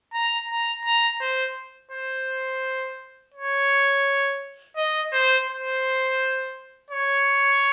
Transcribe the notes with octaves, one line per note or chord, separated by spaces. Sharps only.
A#5
A#5
A#5
C5
C5
C#5
D#5
C5
C5
C#5